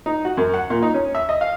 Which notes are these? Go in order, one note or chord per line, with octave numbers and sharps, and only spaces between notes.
D#4
F#4
F#2
F#5
A#2
D#4
C#4
E5
D#5
F5